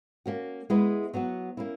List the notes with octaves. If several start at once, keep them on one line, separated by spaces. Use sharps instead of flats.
A#3 C#4 F#4
G#3 B3 E4 B4
F#3 B3 F#4
A#3 C#4 E4